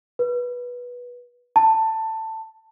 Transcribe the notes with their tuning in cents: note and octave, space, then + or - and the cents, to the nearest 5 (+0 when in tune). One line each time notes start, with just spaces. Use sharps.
B4 -15
A5 +15